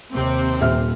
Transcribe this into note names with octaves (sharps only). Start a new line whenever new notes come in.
D#2 C3 C4
D#1 E5 F6